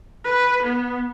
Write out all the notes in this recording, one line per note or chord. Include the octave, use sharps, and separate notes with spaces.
B4
B3